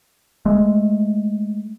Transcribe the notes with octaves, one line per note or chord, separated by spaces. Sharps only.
G#3 A3